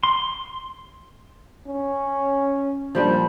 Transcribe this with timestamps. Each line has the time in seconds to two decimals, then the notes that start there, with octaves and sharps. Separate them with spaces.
0.03 C6
1.67 C#4
2.95 A#2 F3 G3 D4